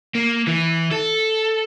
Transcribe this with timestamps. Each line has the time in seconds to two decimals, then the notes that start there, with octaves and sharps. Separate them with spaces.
0.15 A#3
0.47 E3
0.91 A4